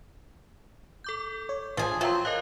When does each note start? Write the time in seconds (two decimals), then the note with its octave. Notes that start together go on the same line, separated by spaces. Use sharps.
1.04 A4 D6 G6
1.49 C#5
1.77 A1 F3 G#4
2.01 F3 F#3 C4 F4 E5 A#5
2.25 A#4 D#5 F5 F#6